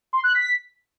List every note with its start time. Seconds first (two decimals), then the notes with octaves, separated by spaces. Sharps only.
0.13 C6
0.24 F#6
0.34 B6